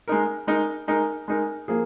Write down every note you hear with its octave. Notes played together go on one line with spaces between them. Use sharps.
G#3 D#4 A#4
G#3 D#4 A#4
G#3 D#4 A#4
G#3 D#4 A#4
F3 A#3 G#4